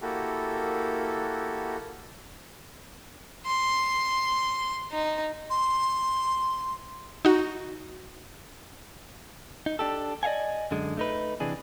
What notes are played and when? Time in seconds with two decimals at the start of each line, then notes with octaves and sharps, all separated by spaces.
0.01 A#3 E4 F#4 G4 A4
3.47 C6
4.92 D#4
5.50 C6
7.25 D#4 F#4
9.66 D#4
9.79 D4 G4 A4
10.23 D5 D#5 F5 F#5 G#5
10.71 F#2 D3 G#3
10.97 A3 D#4 B4
11.40 C3 E3 D4 G#4